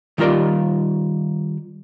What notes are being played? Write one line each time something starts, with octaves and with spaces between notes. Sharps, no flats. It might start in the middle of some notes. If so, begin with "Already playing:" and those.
D#3 G3 F4 A#4 D5